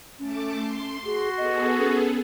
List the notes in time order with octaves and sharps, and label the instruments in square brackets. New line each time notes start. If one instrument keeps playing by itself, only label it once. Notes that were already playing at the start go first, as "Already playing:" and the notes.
[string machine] A3 A5 D6 [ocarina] C#4
[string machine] C6
[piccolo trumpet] F#4 [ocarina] G#4
[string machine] B3 G#4 A4 [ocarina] D#5
[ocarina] C#4